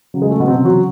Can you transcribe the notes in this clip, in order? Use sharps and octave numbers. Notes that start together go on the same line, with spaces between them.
C#3 F#3
G#3
A3
B2 B3
C3 C4
F#3 F#4